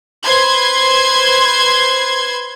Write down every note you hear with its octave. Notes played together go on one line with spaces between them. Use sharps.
B4 C5 C6 G#6